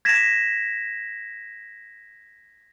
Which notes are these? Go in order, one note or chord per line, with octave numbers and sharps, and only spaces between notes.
G#6 A#6 B6 E7